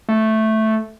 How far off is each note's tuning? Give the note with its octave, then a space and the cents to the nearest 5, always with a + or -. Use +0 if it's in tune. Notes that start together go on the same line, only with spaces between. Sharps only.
A3 -5